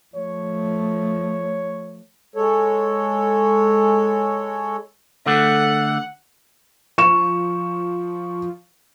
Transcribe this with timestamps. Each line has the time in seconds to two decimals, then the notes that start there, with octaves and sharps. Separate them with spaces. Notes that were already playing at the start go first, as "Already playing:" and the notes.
0.16 F3 A3 C#5
2.36 G#3 A4 C#5
5.26 D3 A3 F#5
6.98 F3 C#6 E7